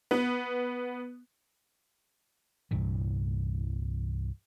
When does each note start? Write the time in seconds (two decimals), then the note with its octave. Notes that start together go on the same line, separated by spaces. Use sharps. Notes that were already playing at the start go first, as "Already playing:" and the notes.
0.11 B3
2.71 C2 G2 A#2 E3